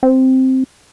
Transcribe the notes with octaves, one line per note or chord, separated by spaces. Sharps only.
C4